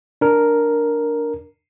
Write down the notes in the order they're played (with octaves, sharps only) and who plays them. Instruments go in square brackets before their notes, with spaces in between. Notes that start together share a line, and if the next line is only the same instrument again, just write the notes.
[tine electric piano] D4 A#4